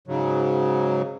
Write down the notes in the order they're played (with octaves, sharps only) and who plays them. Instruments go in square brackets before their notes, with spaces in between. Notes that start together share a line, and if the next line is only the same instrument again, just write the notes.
[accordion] G#2 C#3 F#3